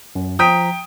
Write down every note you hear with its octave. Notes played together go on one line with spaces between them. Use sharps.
F#2
F3 G5 A#5 D#6 B6